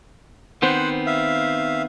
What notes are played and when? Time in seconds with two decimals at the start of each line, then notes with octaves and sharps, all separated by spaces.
0.62 D#3 B3 C4 C5 F#5
1.06 E5 F5